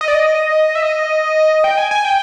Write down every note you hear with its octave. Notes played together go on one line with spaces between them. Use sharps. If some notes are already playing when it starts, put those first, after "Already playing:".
D#5
D5
D#5
E5
D#5
G5
G#5
G#5
G5